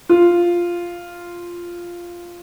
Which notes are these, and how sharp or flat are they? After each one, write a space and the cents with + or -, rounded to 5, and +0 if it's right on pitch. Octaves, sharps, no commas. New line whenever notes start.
F4 -5